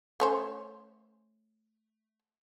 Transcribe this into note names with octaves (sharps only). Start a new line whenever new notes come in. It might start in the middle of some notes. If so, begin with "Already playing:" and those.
A3 C#4 C5